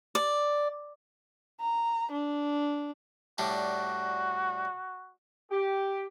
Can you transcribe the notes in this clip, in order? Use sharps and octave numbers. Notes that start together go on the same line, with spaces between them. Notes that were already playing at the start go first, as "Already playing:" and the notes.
D5
A#5
D4
A2 G3 D4 F#4
G4